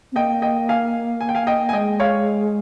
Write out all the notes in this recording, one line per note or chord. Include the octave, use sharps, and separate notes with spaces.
C4
A#3 D#5 G5
D#5 G5
F5 G#5
G#5
G5
F5 G#5
D#5 G5
G#5
G#3 D#5 G5
C#5 F5